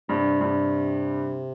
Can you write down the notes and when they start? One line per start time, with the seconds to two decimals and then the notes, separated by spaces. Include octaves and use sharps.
0.09 G2 C3
0.41 G2